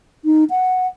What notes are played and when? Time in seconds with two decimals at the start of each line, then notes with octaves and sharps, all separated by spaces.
0.25 D#4
0.50 F#5